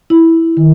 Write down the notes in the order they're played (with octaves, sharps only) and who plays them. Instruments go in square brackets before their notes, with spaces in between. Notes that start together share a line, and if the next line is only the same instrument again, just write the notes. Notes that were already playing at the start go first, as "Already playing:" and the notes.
[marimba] E4
D#3